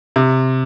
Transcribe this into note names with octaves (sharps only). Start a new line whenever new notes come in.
C3